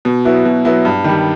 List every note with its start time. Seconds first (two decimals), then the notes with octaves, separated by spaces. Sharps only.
0.05 B2
0.25 F#3 B3 E4
0.45 B2
0.65 F#3 B3 E4
0.85 G2
1.04 D#3 G3